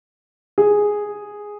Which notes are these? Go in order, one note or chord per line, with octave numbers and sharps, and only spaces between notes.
G#4